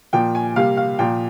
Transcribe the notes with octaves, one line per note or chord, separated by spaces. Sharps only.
A#2 F3 A#3 G5
G#5
C3 G3 A#3 F5
F5
A#2 F3 A#3 G5